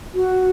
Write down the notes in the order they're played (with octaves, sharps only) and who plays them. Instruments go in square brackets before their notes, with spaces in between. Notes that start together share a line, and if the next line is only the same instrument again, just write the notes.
[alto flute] F#4